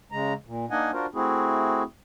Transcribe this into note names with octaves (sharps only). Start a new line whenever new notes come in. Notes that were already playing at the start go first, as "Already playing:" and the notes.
C#3 G#3 A#5
A#2
A#3 D4 D#4 D#5 F#5 G#5
D4 F4 F#4 A#4 C5
A3 C4 E4 F#4 G#4